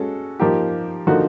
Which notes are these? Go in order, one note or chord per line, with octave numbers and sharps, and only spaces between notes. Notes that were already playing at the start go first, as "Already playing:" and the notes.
Already playing: G#3 C#4 F#4 A4
F3 A#3 D#4 G4
D3 F3 A#3 D#4 F#4